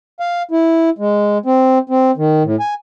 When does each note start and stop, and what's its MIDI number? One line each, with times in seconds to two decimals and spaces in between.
0.20 0.42 77
0.51 0.90 64
0.98 1.38 56
1.46 1.78 60
1.89 2.11 60
2.17 2.43 51
2.44 2.56 45
2.60 2.74 80